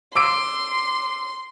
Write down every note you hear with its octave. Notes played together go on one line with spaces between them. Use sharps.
C6 D6 E6 D7